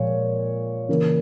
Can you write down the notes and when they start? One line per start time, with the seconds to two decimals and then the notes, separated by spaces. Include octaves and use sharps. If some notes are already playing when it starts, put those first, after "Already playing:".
Already playing: A#2 F3 G#3 C#5
0.89 C#3 E3 A#3